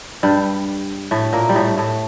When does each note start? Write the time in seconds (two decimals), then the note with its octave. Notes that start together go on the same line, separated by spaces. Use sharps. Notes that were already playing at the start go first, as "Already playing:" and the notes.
0.23 G2 G3
1.11 A2 A3
1.33 A#2 A#3
1.49 G3
1.55 A2 A3
1.77 A2 A3